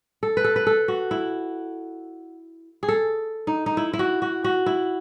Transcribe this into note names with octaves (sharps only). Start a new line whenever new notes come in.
A4
B4
A4
B4
A4
F#4
E4
G#4
A4
D#4
D#4
E4
E4
F#4
F#4
F#4
E4